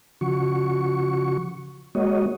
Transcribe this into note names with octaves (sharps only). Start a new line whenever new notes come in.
C#3 F3 F#4 C#6
G#3 A#3 F#4 C#5 D#5